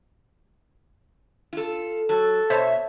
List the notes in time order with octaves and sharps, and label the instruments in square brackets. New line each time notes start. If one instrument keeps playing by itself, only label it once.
[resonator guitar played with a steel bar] F4 A4
[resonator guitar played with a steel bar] F#3 [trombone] A4
[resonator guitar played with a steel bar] B2 [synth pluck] C5 C#5 A5 [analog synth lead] E5